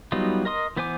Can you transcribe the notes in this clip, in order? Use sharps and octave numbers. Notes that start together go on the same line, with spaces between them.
F#3 G3 B3 D#4 F4
A#4 D#5 C6 D#6
E3 B3 C5 G#5 D6